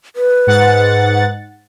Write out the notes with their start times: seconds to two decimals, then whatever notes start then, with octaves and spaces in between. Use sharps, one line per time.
0.16 B4
0.47 G#2 F#5 A6